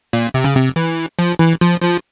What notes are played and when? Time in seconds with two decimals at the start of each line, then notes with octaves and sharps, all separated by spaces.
0.13 A#2
0.34 C3
0.45 C#3
0.56 C3
0.76 E3
1.19 F3
1.39 E3
1.61 F3
1.82 F3